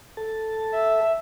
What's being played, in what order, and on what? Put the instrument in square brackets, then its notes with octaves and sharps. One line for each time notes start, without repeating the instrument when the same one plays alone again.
[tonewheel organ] A4 A5
[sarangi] E5